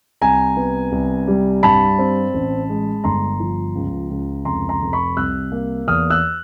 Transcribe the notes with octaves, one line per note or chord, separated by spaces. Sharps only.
C2 G#5 A#5
B3
C2
G3
G2 A5 B5
C4
A1
G#3
G1 A#5 C6
F3
C#2
C#2
F1 A#5 C6
A#5 C6
F1
B5 C#6
C2 E6 F#6
A#3
E2 D#6 F6
E6 F#6